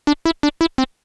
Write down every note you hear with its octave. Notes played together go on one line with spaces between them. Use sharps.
D4
E4
D4
E4
C4